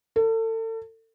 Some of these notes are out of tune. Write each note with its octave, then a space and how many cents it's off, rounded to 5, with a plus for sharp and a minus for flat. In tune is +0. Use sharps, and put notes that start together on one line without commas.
A4 +35